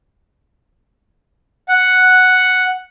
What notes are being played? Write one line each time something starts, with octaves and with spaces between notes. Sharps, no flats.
F#5